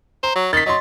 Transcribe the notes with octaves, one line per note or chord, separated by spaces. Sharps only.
C5 A#5
F#3
D#3 A6 B6
F#3 D#5 C6